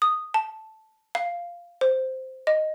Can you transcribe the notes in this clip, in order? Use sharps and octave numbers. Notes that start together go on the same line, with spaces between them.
D#6
A5
F5
C5
D#5